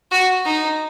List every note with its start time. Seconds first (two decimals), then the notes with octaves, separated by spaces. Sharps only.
0.11 F#4
0.45 D#4